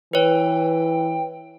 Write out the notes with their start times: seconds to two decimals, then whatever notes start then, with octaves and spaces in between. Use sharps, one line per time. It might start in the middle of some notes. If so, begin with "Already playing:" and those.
0.13 E3 B4 C#5 G5